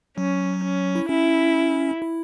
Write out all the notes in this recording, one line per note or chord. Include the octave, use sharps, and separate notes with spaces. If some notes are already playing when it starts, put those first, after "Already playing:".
F#3 C#4
C#4
E4
C#4 E4
E4